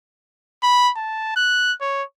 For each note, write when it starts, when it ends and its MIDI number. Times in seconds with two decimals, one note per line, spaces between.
0.63 0.91 83
0.97 1.33 81
1.36 1.73 90
1.81 2.03 73